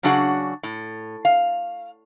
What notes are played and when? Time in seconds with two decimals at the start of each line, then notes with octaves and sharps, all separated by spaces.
0.03 C#3 F#3 D4 F#4 G#4 F#5
0.63 A2
1.25 F5